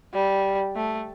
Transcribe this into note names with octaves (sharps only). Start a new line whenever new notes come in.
G3
A3